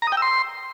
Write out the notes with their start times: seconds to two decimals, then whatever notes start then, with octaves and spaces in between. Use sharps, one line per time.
0.02 A#5
0.07 D#6
0.12 G5
0.17 E6
0.22 C6